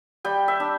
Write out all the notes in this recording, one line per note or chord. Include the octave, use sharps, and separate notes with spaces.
G3 G5
E5
D4